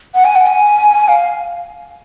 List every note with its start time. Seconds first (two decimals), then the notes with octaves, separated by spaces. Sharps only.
0.15 F#5
0.25 G#5
0.36 F#5
0.47 G#5
1.08 F5